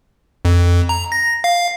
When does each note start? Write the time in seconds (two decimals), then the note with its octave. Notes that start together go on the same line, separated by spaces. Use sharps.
0.45 F2
0.89 A#5
1.12 A#6
1.44 F5